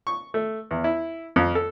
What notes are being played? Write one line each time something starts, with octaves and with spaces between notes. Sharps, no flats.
C#6
A3
E2
E4
F2
A4